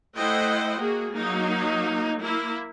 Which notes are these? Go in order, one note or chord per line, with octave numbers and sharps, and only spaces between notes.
A3 E4 C5 D#5 F#5 G5
A#3 F#4 G#4
F#3 A#3 D#4
A#3 E4